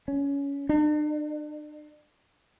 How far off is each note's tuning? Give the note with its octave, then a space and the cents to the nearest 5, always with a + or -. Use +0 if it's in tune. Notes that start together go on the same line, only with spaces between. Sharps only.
C#4 +20
D4 +45